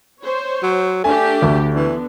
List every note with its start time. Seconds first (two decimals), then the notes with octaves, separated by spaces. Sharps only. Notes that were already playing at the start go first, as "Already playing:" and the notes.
0.22 C5 C#5
0.63 F#3
1.04 A3 D4 G4 G#5
1.42 D2
1.74 D3 E3 B3